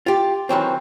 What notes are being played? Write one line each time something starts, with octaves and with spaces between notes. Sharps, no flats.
F4 G4
D#3 E3 F#3 C4